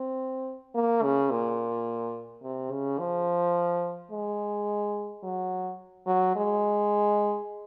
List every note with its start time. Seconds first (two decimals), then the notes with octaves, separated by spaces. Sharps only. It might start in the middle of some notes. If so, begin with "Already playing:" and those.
Already playing: C4
0.75 A#3
1.02 C#3
1.30 A#2
2.42 C3
2.71 C#3
2.99 F3
4.11 G#3
5.23 F#3
6.06 F#3
6.36 G#3